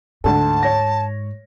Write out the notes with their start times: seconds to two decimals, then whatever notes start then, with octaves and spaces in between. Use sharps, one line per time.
0.24 D2 G#2 A4 A5
0.63 C#5 A#6